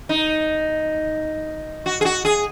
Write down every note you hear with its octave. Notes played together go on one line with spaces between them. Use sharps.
D#4
F#4
G#4
F#4
G#4